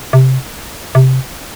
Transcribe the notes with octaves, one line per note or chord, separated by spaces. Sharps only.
C3
C3